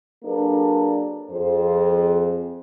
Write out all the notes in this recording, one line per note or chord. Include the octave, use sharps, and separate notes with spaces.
F#3 A#3 D4 G#4 A4 B4
F2 G#4 C5